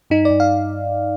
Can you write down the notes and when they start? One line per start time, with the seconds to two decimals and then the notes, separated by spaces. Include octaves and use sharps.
0.10 G2 D#4
0.25 G2 D5
0.40 F5